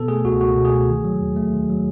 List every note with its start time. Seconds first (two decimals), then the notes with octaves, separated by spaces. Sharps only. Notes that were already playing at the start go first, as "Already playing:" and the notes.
Already playing: B2 B3 A4
0.08 A3 G#4
0.24 C#2 F#4
0.41 C#2 F#4
0.57 B2
0.65 G#4
0.73 A3
0.89 D#3
1.05 F#3
1.21 D#2
1.36 A3
1.53 D#3
1.69 F#3